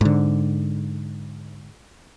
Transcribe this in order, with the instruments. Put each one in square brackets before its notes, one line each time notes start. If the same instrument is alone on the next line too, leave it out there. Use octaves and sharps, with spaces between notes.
[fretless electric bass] G#2 D3